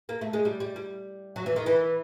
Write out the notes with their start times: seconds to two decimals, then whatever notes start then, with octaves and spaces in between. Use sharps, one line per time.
0.09 A#3
0.21 A3
0.33 G#3
0.45 G3
0.60 G3
0.76 G3
1.36 F#3
1.46 E3
1.56 D#3
1.66 E3